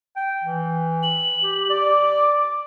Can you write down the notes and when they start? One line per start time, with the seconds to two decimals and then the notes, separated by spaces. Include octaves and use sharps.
0.16 G5
0.44 E3
1.03 F#7
1.43 G4
1.70 D5 D6